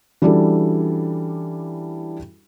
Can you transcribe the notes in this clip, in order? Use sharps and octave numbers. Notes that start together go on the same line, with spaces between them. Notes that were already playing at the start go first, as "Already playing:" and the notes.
E3 G3 C#4 D4 F#4 A4